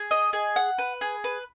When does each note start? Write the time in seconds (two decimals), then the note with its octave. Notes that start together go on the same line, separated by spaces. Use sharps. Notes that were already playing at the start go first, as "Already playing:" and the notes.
Already playing: G#4
0.11 D#5
0.33 G#4
0.56 F#5
0.78 B4
1.01 G#4
1.24 B4